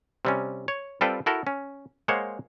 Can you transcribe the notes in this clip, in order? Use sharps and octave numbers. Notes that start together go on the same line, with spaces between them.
C3 G3 C#4
C#5
G3 C4 F4 A4 B4 G5
E4 F#4 A4 A#4
C#4
G#3 A#3 C5 C#5 F#5